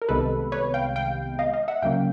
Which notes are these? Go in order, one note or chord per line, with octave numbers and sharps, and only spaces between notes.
A#4
C2 C3 D#3 G#3 B3 A4 B4
B4 C#5
F5 G5
F5 G5
D#5 F5
D#5 F5
E5 F#5
D2 C#3 F#3 A#3 C#4 F5 G5